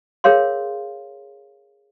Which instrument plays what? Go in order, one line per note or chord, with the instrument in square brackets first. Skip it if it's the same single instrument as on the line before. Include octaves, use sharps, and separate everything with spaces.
[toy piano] G#4 A#4 C#5 F5 C6